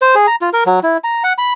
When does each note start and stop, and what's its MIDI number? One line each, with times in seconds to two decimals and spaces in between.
0.02 0.15 72
0.15 0.27 68
0.27 0.36 82
0.41 0.50 65
0.53 0.64 70
0.66 0.80 54
0.83 0.97 64
1.04 1.23 82
1.24 1.33 78
1.38 1.53 83